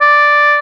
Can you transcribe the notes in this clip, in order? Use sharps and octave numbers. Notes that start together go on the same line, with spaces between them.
D5